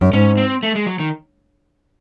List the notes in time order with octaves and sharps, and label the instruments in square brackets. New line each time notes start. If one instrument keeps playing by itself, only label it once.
[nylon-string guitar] F#2
[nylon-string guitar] G#2 [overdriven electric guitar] C#4
[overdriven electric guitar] C4
A3
G#3
F#3
D#3